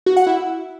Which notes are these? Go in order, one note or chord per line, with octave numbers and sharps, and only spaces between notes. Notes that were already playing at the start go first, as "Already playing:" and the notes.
F#4
F#5
E4